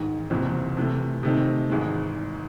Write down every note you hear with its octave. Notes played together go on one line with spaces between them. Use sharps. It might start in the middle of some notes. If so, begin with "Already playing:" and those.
Already playing: A1 G#2 D#3
F#1 E2 C3 E3 C4
C3 E3 A3
C3 D#3 A3 C4 D#4
G#1 G#2 E3 G#3